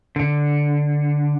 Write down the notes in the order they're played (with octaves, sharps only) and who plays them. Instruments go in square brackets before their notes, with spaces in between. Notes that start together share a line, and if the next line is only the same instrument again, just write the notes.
[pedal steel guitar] D3